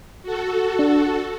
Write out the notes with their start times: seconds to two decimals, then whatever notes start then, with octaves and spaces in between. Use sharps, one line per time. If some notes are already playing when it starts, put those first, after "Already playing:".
0.23 F#4 A4
0.79 D4